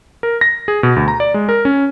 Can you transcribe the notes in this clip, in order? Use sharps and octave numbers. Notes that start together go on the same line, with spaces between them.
A#4
A#6
G#4
B2
D2
A#5
D5
G#3
A#4
C#4